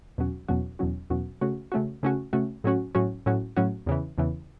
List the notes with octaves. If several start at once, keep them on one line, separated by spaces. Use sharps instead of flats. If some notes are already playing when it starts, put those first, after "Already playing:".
E2 B2 F#3 C#4 F#4
E2 B2 F#3 C#4 F#4
E2 B2 F#3 C#4 F#4
E2 B2 F#3 C#4 F#4
C#3 A3 C#4 F#4
C#3 A3 C#4 F#4
C#3 A3 C#4 F#4
C#3 A3 C#4 F#4
A2 F#3 C#4 F#4
A2 F#3 C#4 F#4
A2 F#3 C#4 F#4
A2 F#3 C#4 F#4
E2 C#3 E3
E2 C#3 E3